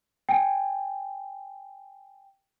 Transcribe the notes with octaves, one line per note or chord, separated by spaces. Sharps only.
G5 G#5